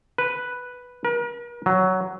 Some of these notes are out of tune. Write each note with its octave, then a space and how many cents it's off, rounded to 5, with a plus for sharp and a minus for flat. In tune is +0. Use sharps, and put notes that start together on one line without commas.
B4 +0
A#4 +45
F#3 +10